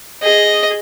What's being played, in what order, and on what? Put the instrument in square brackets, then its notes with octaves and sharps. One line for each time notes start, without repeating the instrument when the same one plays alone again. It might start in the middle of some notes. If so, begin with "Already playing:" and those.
[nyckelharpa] G#4 [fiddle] D#5